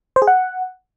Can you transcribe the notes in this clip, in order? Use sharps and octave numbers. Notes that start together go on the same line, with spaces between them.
C5
G#4
F#5